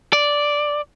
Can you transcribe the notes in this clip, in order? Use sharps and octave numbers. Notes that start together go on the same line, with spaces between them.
D5